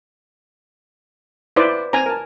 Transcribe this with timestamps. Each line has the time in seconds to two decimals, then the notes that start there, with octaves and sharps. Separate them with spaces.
1.56 E4 B4 C5 D5
1.93 C4 G#5 A#5
2.06 A#4 A5